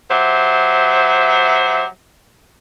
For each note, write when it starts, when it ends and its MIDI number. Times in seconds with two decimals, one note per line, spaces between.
0.11 1.84 54
0.11 1.84 67
0.11 1.84 72
0.11 1.84 76